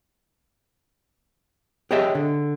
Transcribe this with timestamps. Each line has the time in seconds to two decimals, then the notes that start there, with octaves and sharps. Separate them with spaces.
1.91 G4 G#4 C#5 D#5 E5 G5
2.15 D3